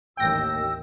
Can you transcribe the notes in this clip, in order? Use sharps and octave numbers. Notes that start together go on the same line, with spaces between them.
A1 D#2 G5 E6 A#6